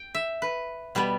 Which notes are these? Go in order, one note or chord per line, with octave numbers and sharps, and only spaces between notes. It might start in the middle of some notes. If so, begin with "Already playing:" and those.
Already playing: G5
E5
B4
B2 G3 B3